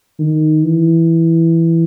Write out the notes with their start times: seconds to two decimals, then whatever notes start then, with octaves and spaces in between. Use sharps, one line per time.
0.19 D#3
0.64 E3